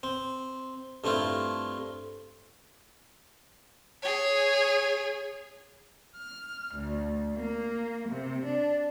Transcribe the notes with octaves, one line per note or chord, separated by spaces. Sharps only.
C4
G2 A3 C4 E4 F4
G#4 C#5
F6
D2
A#3
C3
D4